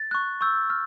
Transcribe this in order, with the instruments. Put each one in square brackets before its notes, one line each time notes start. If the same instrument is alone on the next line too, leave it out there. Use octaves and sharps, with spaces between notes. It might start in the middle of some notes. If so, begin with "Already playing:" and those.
Already playing: [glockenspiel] A6
C#6 F#6
C#6 E6 G6
F6